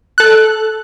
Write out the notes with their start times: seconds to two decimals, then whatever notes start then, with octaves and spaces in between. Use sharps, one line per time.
0.18 A4 F#6